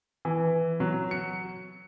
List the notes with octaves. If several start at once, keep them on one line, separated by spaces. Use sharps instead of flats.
E3
F#3
C#7